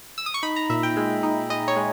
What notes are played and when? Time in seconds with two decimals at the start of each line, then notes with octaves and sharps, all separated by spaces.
0.18 E6
0.26 D#6
0.34 C#6
0.43 D#4 B5
0.56 A#5
0.69 A#2 E5
0.83 G5
0.97 G#3
1.23 D#4
1.50 G#3 D#5
1.68 C#5
1.76 G#3